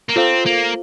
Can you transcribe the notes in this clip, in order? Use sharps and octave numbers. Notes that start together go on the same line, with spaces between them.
A#3
C4 F4 A4 C5 F5
A#3